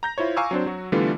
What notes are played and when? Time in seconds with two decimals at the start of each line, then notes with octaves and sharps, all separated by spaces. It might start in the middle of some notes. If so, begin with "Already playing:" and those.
0.03 A#5 G6 A#6
0.18 E4 F4 C5 C#5
0.37 F5 G#5 A#5 C#6 D6 E6
0.51 F#3 C4 D4 C5
0.66 F#3 F#4
0.92 D3 E3 G3 A3 B3 F4